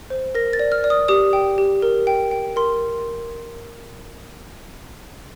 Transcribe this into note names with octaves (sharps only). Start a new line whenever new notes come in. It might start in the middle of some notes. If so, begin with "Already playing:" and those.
C5
A#4 A#6
A6
D5
F6
D5
D#6
G4 D#6
G5
G4
A#4
G5
G5
A#4 C6